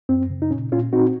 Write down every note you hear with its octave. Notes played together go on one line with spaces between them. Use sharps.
F#2 C4
C#3
D#4
A#2 C#4
A#2 C#4 F4
C4 D#4 F#4